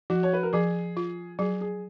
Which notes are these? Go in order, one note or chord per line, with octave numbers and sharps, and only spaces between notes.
F3 F#4
C#5
B4
A#4
F3 G#4
F4
F#3 G#4
G#4